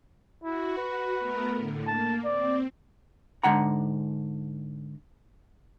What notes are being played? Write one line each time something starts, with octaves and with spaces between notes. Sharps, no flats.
E4 F#4
B4
A3 B3 A#4
A2 D3
A#3 A5
C4 D5
G#2 D3 F#5 A#5